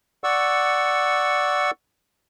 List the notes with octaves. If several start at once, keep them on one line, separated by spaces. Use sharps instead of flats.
D5 F#5 C#6 E6